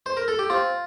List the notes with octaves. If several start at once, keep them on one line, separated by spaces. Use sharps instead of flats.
C5
A#4
A4
G4
C4 F4